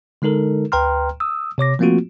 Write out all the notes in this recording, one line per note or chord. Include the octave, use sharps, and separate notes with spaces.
D3 G#3 D#4 A4 A#4
D2 B4 G5 A#5 C6 F6
D#6 E6
C3 C#5 D6 A#6
F3 A3 A#3 C4 F4 F#4